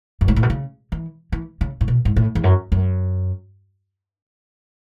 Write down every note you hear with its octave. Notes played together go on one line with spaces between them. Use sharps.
F#2
G#2
A2
B2
C#3
E3
E3
C#3
A2
B2
G#2
A2
E2
F#2
F#2